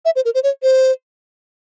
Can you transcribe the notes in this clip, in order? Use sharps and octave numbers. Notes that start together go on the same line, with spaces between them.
E5
C5
A#4
C5
C#5
C5